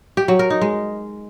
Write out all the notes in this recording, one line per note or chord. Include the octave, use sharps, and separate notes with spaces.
G4
F#3
A#4
D#4
G#3